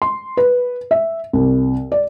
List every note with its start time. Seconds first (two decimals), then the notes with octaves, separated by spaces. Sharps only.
0.02 C6
0.37 B4
0.91 E5
1.33 C2
1.92 D5